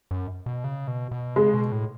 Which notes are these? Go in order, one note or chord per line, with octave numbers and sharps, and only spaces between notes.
F#2
B2
C#3
B2
B2
C#3 G#3
B2
A2